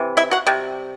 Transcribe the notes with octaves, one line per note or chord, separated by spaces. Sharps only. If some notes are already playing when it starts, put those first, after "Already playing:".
Already playing: C3 E3
E4 E5
F#4 F#5
C3 G3